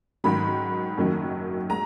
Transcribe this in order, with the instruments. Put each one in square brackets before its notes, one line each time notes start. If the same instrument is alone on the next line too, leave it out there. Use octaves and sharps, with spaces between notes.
[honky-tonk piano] G#2 D#3 F#3 B5
F#1 F#2 D#3 F#3
G#3 A#5